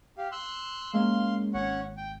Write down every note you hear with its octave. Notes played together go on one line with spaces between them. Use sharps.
G4 F5
C6 E6 F#6
G#3 A#3 C#4 F5 C6
G#1 C#4 C#5 F#5
G5